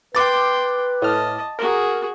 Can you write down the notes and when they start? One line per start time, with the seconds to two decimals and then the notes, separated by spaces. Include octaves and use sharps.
0.15 B4 G5 C6 D6 A6
1.02 A2 D#5 A5 F6
1.59 F#4 G#4 A#4